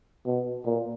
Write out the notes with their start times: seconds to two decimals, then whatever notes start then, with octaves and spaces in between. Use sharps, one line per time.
0.26 B2
0.65 A#2